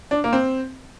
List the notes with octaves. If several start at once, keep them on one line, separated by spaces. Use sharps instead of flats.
D4
A#3
C4